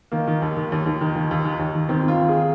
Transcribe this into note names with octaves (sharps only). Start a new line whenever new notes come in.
D#3 A#3
D#3
D#2
D#3
D#2
D#2
D#3
D#3
D#2
D#3
D#2
D#3
D#3 C4
D#3 F4
D#3
G#4